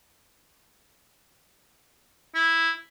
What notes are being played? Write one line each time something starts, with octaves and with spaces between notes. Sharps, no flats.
E4